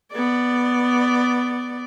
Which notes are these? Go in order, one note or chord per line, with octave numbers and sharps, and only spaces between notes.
B3 D5